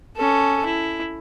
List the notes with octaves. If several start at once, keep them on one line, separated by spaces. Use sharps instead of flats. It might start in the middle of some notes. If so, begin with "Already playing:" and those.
C#4 A4
E4